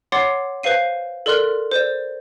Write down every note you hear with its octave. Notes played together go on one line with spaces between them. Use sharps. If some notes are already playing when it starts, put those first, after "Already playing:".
C#5 F#5 C6 D6 A6 C7
B4 C5 F5 C7 D#7
A4 A#4 D5 C6 F6 F#6
C5 D5